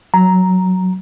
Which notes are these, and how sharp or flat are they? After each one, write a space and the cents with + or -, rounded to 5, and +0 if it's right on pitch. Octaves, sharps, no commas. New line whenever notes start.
F#3 +0 A#5 +0